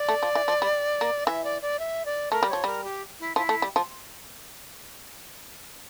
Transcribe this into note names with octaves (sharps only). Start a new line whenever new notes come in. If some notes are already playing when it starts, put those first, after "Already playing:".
Already playing: D5
A3
F3
E3
F3
G3
A#3
E3 E5
D5
D5
E5
D5
A3 A#4
G3
F3 C#5
G3 A#4
G4
E4
F3 E4
A3
G3
F3